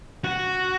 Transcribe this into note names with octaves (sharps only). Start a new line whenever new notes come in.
F#4